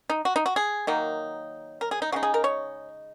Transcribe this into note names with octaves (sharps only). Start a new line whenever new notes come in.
D#4
F#4
D#4
F#4
G#4
D#3 F#3 A#3 D#4
A#4
G#4
D#4
C#3 G#3 D#4 F#4
G#4
A#4
C#5